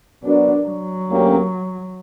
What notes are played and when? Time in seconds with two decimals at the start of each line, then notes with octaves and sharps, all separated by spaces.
0.23 F#3 B3 D4 F#4 A#4 D5
0.65 F#3
1.07 D2 D3 A#3 C#4 G4